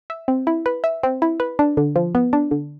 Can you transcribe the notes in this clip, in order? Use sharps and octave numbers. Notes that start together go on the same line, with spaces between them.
E5
C4
E4
B4
E5
C4
E4
B4
D4
D3
F3
B3
D4
D3